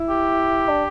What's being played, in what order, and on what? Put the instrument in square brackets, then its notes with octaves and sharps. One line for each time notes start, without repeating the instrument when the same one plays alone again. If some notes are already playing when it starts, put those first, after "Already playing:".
Already playing: [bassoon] E4
[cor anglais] G4
[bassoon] D4